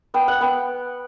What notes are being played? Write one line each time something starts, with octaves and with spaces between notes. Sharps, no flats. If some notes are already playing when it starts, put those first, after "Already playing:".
B3 G5
F#5
B3 G5